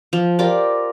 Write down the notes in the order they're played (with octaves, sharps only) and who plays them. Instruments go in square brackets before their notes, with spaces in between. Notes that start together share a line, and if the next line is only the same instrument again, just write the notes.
[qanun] F3
F4 G4 A#4 D5